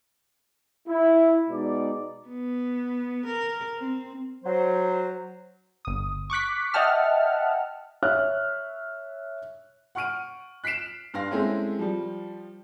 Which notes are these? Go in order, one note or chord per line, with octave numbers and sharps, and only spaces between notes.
E4
B2 G#3 D#4 D5
B3
A#4
C4
F#3 C5
G1 D#6
C#6 D6 F#6 B6
D#5 E5 F#5 G5 A5 F6
C#5 E5 F6 F#6
F#5 C#6 F6 D7 D#7
F#6 B6 C7 D7 E7
G2 F5 C6 A#6
G#3 A3 C4 C#4 E4 G#4
F3 G3